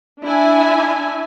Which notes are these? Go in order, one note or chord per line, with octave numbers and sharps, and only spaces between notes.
D4 E4 E5 G#5